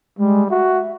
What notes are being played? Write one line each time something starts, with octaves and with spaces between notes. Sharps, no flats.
G3 G#3
F#4 E5